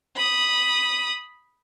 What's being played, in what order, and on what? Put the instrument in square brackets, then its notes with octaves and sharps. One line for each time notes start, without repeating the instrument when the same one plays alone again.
[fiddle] B5 D#6